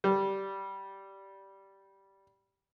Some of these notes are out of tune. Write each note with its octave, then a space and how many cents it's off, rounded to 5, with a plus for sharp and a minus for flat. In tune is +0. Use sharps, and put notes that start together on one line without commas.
G3 -10